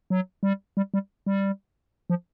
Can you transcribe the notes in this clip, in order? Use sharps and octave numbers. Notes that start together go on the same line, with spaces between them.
F#3
G3
G3
G3
G3
F3